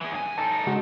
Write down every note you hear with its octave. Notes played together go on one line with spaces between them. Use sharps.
E3 G#4
G2 G#5
D#4 A4 A5
C#3 G#3 F#4